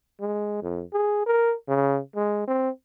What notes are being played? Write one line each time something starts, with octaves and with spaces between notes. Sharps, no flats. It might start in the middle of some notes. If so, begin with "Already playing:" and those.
G#3
F2
G#4
A#4
C#3
G#3
C4